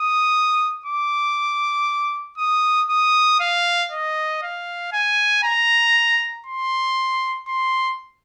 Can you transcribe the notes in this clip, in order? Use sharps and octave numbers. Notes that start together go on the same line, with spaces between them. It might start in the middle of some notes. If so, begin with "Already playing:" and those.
Already playing: D#6
D6
D#6
D#6
F5
D#5
F5
G#5
A#5
C6
C6